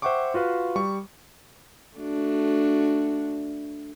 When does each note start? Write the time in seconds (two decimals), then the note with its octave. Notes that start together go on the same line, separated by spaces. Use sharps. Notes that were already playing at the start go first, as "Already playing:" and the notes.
0.02 C5 E5 F#5 G5 C#6 D6
0.34 F4 F#4 B4 F5
0.76 G3 C#6
1.98 A3 D4 F#4